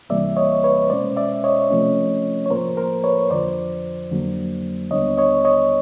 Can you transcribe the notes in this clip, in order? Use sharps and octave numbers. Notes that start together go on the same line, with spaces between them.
C#2 C3 E3 G3 A#3 D5 E5
C#5 D#5
B4 C#5
B2 G#3 C#4 C5 D5
D5 E5
C#5 D#5
C3 F3 A3 C#4
C#5
A2 F3 A#3 A#4 C5
A#4 C5
B4 C#5
F2 D3 F3 C5 D5
F2 D3 F#3 A#3
D#2 D3 G3 B3 D4 C#5 D#5
C#5 D#5
C#5 D#5